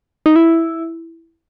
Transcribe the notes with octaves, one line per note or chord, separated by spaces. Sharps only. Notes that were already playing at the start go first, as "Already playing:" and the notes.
D#4
E4